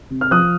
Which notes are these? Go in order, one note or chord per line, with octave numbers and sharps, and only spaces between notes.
C3
F6
F3 D#6 F#6